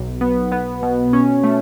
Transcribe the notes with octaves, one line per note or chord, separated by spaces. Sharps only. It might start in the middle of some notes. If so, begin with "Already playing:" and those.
Already playing: B1
B3
B3
B2
C#4
A3